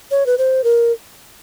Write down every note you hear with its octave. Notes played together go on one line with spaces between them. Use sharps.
C#5
B4
C5
A#4